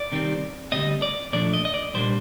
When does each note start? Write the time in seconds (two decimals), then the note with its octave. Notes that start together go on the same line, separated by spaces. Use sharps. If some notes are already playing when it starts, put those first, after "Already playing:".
Already playing: D5
0.12 C3 D#3 G3 C4
0.72 D2 C3 G3 C4 D#5
1.02 D5
1.33 A#2 F3 A3 D4 D5
1.53 D#5
1.65 D#5
1.74 D5
1.94 C2 A#2 G3 A#3 D4 C5